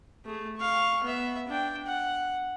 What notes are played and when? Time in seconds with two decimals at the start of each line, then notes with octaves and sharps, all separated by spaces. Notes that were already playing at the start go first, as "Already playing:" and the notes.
0.25 A3 G#4
0.57 F5 C#6
1.03 B3 E5
1.48 D4 G5
1.86 F#5